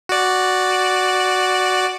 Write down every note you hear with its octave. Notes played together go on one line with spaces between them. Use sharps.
F#4 D5